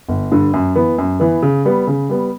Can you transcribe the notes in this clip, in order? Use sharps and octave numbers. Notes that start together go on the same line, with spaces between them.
G1
G2 D3
F#2
E3 B3
F#2
E3 B3
C#3
G3 B3
C#3
G3 B3